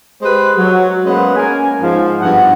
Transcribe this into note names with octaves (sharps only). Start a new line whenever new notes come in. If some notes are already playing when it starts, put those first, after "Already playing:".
G#3 G4 B4 C5
F#3
G#3 A#3 B3 C#4 B4 C5
A#3 C#4 A#4 G#5
G#2 F3
G2 F3 B3 E4 F#5